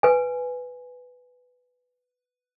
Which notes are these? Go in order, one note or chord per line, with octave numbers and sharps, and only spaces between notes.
B4 G#5